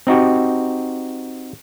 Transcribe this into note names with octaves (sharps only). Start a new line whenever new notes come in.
C4 D#4 F#4 G4